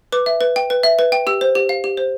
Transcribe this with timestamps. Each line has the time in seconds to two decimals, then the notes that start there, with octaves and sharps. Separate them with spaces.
0.12 B4 D6
0.26 E5
0.41 B4
0.56 G5
0.70 B4
0.83 E5
0.99 B4
1.12 G5
1.27 G4 E6
1.41 C5
1.55 G4
1.69 F5
1.84 G4
1.97 C5